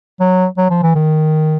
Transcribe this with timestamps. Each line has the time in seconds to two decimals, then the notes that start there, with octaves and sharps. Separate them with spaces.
0.20 F#3
0.58 F#3
0.71 F3
0.83 E3
0.95 D#3